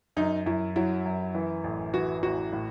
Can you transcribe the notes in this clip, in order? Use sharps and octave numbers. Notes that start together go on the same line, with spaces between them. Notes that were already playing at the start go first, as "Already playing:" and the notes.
F#2 D#4
F#2 E4
F#3 E4
F#2
E3
A1
E3 F#4
A1 F#4
A2